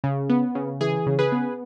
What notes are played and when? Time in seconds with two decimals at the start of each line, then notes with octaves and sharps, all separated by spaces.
0.04 C#3
0.30 B3
0.55 C#3
0.81 E3 G#4
1.06 C#3
1.19 G#4 B4
1.32 B3